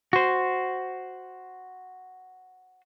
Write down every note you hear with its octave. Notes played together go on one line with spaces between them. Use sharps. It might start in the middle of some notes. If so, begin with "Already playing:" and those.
F#4 C5